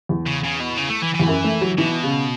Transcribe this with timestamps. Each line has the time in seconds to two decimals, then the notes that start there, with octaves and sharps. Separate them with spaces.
0.09 E2
0.26 C#3
0.44 C#3
0.60 B2
0.78 C#3
0.90 A3
1.02 E3
1.15 E2 E3
1.28 F#2
1.44 A3
1.61 F#3
1.78 B2 E3
2.03 C#3